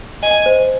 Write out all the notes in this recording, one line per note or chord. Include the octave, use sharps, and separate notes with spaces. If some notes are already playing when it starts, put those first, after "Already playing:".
D#5 G#5
C5